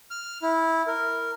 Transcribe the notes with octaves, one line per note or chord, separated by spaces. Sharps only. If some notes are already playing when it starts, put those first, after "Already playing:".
F6
E4
A#4